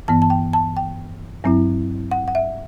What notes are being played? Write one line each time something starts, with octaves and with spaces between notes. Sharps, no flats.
G2 E3 B3 A5
A5
G5
A5
G5
G2 F#3 C4 E4
F#5
F#5
E5